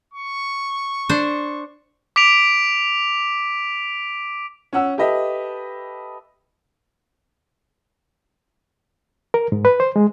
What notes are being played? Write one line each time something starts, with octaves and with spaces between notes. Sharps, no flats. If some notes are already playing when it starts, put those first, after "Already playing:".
C#6
D4 C5
D6 B6 D7 F7
C#4 F#5 E6
G4 A4 B4 D#5 E5
A#4
G#2
B4
C5
G#3